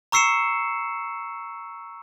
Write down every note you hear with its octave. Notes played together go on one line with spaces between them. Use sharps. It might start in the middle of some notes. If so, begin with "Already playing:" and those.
A#5 C#6 E6 C7 C#7 E7